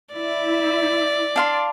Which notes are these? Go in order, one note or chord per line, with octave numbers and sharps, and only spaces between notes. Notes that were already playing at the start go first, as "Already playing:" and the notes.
E4 D5 E5
D4 F5 C6